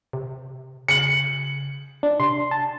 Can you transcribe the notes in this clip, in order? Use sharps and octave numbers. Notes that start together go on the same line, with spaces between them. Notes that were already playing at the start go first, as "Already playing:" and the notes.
C3
C#3 C#7 F#7
D4
C3 C6
A5